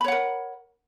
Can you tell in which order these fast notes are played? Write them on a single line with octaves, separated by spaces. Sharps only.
B5 C#5 F#5 A#4